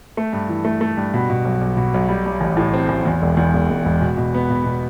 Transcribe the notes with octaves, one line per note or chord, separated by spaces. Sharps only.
A3
G2
E3
A3
A3
G2
B2
B2
B1
B1
B2
B1
G3
G3
A1
A2
C4
A1
E2
E1
E2
E1
E1
E1
B2
B2
B3
B2
B2